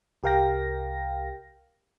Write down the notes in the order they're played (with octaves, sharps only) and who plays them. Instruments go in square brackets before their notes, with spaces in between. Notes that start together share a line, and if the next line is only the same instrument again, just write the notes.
[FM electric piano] C2 G4 A#4 F5 G5 A#6